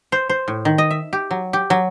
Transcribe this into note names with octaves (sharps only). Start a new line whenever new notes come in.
C5
C5
A2
D#3
D#5
E5
G4
F#3
G4
F#3